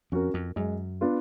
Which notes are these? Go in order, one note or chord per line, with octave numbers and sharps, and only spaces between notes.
F2 C#4 F#4 A#4
F2
F#2 G#3
B3 D4 F4